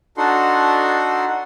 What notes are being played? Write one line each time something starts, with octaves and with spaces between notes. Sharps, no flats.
D4 D#4 F#4 A4 F#5 C6